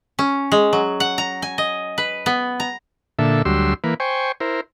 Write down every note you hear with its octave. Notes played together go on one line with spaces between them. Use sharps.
C#4
G#3
F#3
F#5
A#5
G#5
D#5
B4
B3
A#5
A#2 D3 A4 E5
D2 F#3 G3 C6 E6
E3 A#3 B4
C5 G5 G#5 C#6
E4 A#4 C5